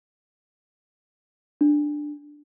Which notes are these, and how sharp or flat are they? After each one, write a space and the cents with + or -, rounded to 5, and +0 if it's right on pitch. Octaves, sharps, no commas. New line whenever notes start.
D4 +10